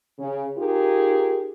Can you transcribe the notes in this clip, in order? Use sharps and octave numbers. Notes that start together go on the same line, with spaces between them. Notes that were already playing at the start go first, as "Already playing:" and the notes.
C#3
D#4 F4 G4 G#4 A#4